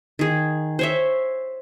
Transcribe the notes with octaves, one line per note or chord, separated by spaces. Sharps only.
D#3 G#4
C5 C#5 E5